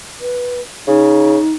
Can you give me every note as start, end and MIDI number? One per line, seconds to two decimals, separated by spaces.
0.21 0.61 71
0.88 1.38 49
0.88 1.54 63